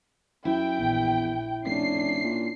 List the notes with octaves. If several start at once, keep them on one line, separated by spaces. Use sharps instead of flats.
F#2 E4 G5
A#1 E2
F1 C#4 D4 C7
A#2